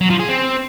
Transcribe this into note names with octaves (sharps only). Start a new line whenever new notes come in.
F#3
F3
G#4
C4